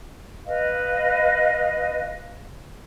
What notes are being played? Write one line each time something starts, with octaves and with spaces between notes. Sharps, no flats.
B4 D#5 F5